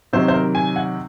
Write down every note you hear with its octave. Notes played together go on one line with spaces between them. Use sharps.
C3 D#3 F#3 C4 D#4 C5
C5
A#4
G#5
F#5